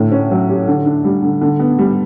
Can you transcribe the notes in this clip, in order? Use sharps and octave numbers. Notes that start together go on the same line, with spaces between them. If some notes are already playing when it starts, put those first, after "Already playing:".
Already playing: A2 D3
C#4
F#3
G4
D3
D4
G3
D3
D3
B3
G3